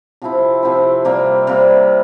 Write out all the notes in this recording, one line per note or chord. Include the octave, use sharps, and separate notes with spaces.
C3 F3 C4 E4
C3 F3 C4 E4
C3 G3 A#3
C3 G3 A#3